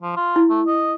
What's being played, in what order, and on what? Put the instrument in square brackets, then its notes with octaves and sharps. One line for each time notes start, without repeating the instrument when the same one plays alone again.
[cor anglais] F3
F4
[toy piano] E4
[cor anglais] A3
D#5